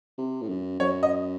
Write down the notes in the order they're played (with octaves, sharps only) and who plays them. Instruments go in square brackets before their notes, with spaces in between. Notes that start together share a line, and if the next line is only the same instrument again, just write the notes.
[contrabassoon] C3
A2
F#2
[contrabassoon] F#2 [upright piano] C#5
[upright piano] D#5